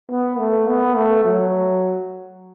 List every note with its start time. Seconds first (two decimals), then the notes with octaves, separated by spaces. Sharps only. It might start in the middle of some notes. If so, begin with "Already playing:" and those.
0.10 B3
0.38 A3
0.68 B3
0.96 A3
1.25 F#3